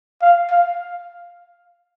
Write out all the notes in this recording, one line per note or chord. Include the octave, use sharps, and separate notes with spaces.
F5
F5